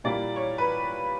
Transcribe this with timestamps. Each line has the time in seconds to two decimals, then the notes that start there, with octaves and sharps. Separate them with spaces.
0.04 A#2 G3 A#3 E4 D5
0.36 C#5
0.58 B4